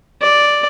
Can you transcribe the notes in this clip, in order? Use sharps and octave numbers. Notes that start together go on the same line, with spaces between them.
D5